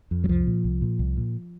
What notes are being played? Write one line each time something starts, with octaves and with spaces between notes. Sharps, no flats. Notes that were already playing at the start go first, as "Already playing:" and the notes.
F2
F#3
C2 F3
A#2
C2
A#2
C2
A#2